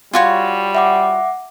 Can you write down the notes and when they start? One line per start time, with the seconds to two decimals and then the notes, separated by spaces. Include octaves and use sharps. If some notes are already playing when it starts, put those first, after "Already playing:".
0.13 G3 F4 F#4 C#5
0.75 E5 F#5 D6